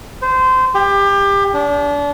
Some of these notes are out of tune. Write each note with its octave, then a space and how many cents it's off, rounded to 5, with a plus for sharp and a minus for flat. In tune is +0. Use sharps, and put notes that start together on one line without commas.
C5 -20
G4 +25
D4 -30